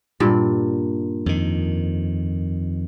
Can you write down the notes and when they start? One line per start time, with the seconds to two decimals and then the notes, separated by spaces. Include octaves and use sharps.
0.20 G2 A#2 D5
1.26 F2 D#3